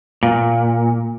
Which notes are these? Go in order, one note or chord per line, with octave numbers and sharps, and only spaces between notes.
A#2